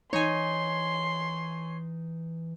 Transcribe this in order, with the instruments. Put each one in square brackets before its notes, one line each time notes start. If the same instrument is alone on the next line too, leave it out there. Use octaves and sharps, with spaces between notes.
[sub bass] E3 [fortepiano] D#4 [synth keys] C#5 G#5 [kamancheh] C6